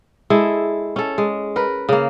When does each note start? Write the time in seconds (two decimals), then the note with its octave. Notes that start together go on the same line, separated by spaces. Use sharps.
0.30 G#3 E4 A4
0.96 C#4 A4
1.18 G#3
1.56 A#4 B4
1.89 C#3 A#3